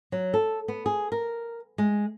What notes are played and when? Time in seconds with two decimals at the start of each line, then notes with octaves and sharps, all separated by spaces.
0.12 F#3
0.34 A4
0.68 B3
0.86 G#4
1.12 A#4
1.78 G#3